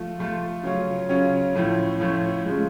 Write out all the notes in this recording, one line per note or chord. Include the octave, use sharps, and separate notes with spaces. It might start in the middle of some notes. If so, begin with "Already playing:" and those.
Already playing: F3 A3 F4
F3 A3 F4
C#3 F#3 C#4 F4
C#3 F#3 C#4 F4
A2 F3 A3 C#4
A2 F3 A3 C#4
C#3 F3 G#3